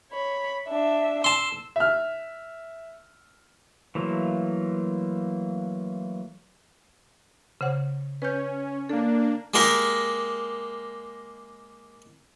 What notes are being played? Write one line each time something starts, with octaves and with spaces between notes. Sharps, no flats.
C#5 B5
D4 E5
A5 C6 E6
E5 F6
E3 F#3 A3 A#3 F4
C#3 C5 F#5
C#4 B4 G6
A#3 D4 A4
G#3 A#3 G4 A#4